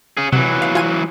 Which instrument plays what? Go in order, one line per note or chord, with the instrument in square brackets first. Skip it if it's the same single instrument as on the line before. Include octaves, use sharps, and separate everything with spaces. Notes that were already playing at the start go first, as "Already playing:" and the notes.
[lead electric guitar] C#4 G#4
[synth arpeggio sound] C3 [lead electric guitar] E3 F#3
[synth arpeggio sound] F5
F4 G#5 D#7